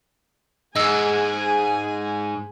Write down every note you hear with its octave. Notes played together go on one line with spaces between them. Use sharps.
G#2 G#4 D#5 G#5 E6